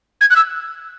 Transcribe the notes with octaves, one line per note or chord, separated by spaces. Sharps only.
G#6
F#6
E6